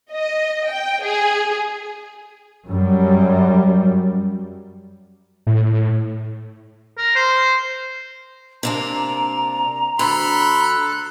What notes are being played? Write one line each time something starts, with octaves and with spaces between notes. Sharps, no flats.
D#5
G5
G#4
F#2 G3
A2
A#4
C5
C3 A#3 D4 A#5
D2 A4 B5 C6 F#6